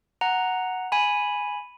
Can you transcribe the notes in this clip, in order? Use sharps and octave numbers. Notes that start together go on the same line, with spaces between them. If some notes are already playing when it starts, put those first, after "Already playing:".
F#5 A#5
G#5 B5